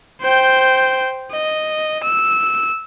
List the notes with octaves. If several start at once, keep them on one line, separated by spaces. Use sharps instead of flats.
C5 G5
D#5
E6